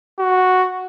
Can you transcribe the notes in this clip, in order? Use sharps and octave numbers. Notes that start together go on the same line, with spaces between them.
F#4